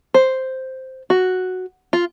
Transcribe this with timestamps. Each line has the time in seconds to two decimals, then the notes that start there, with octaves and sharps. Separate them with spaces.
0.14 C5
1.10 F#4
1.93 F4